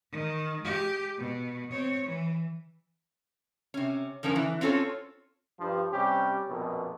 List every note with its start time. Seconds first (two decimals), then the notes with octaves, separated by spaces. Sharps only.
0.11 D#3
0.61 G#3 G4
1.17 B2
1.71 C4 C#5
2.06 E3
3.74 C3 C#4
4.23 F#2 F3 C#4 D4 A#4
4.36 E3
4.61 C4 C#4 F4 A4 C#5
5.60 G2 F3
5.92 C3 G3 C#4 G4
6.49 A#1 F2 B2